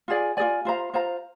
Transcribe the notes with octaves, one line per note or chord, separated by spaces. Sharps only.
F4 G#4 D5 G#5
F4 G#4 D5 G#5
F4 C5 F5 A#5
F4 C5 F5 A#5